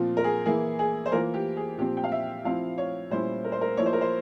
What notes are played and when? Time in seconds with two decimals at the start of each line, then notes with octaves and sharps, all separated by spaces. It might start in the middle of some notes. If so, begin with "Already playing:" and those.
Already playing: A#2 F3 C4 F4
0.17 A#4
0.24 G#4
0.46 E3 A#3 E4 G#4
0.79 G#4
1.06 C5
1.12 E3 A#3 F4 A#4
1.34 G4
1.57 G#4
1.78 A#2 F3 C4 G4
1.97 G5
2.04 F5
2.12 E5
2.45 F3 C4 E4 F5
2.78 C#5
3.10 A#2 G3 C#4 E4 C5
3.44 A#4
3.52 C5
3.61 A#4
3.77 F3 A#3 E4 C#5
3.86 C5
3.93 A#4
4.01 C5